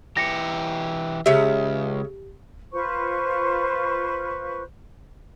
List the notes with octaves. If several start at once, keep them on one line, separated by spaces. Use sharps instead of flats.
E3 G4 A#6 C#7
C#2 C#3 G4 E5
F4 B4 C5 C#6